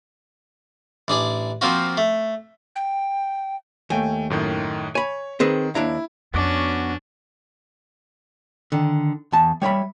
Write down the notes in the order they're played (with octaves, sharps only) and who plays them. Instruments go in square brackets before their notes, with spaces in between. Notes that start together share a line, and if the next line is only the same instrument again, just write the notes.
[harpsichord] A1 D4 G#4 D5
F3 A#3 C4 F4 F#4
A3
[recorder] G5
[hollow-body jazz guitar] D#2 [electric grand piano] A3 G5 G#5
[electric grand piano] F#2 A2 D#3
[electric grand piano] C#5 [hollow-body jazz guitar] G#5 B5
[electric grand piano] D#3 [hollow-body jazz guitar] C4 G#4 B4
[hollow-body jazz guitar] D#2 D4 A#5 [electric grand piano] E4
[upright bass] F2 [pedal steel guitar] B3 F#4 D6 [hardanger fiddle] C#4 D4
[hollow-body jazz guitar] D3 D#3
E2 A5
G3 C#5 E5 B5